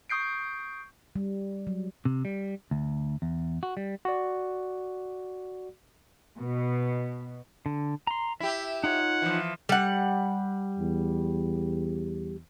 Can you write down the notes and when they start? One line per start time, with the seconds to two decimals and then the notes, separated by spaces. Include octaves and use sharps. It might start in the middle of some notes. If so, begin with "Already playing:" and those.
0.10 C#6 D#6 G6 C7 D7
1.16 G3
1.67 F#3
2.05 C3
2.25 G3
2.71 D2
3.22 E2
3.63 F#4
3.77 G3
4.05 F#4 D5
6.40 B2
7.66 D3
8.07 A#5 C6
8.40 E4 G4 E5
8.84 D#4 F4 C#5 F#5
9.22 E3 F3
9.69 G3 F#5
10.79 E2